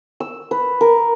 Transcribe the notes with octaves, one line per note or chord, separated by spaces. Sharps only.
E6
B4
A#4